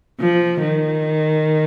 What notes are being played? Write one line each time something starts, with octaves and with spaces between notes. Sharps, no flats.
F3
D#3